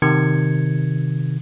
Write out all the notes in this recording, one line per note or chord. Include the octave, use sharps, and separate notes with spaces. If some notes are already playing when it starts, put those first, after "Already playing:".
C3 D#3 G#6 C#7